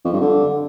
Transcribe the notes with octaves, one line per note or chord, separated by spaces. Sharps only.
F2
G2
D3